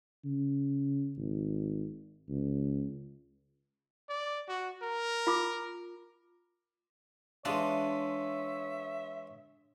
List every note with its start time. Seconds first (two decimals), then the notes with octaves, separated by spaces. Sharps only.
0.25 C#3
1.17 G#1
2.28 C#2
4.09 D5
4.49 F#4
4.82 A#4
5.27 F4 D6
7.45 E3 G#3 D4 F4 C#5 E5